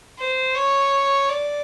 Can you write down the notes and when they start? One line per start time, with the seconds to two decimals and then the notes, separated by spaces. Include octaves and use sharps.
0.18 C5
0.55 C#5
1.29 D5